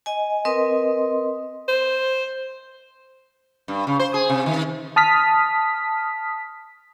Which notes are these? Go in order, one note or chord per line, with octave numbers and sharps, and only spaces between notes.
D#5 G#5
C4 A#4 B4 D#5 C6 D#6
C5
G2
C#3
C5
G#4
C3
D#3
A5 D#6 F6 B6